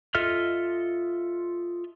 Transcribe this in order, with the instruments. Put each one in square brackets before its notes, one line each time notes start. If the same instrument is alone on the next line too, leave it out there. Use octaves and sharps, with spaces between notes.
[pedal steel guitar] F4 A4 D#5 E5 F6